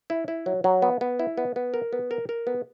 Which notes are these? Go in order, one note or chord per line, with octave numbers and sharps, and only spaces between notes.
E4
E4
F#3
F#3
B3
B3
E4
B3
B3
A#4
B3
A#4
A#4
B3